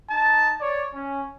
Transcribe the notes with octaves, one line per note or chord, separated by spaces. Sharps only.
D#4 A5
C#5 D5
C#4